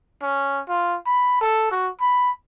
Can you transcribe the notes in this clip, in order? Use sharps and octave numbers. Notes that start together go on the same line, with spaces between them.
C#4
F4
B5
A4
F#4
B5